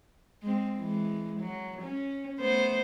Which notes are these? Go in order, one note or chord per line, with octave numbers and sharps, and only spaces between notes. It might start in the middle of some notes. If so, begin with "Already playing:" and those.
G#3 C4
E3 G#3
F#3
C#4
A3 B3 C5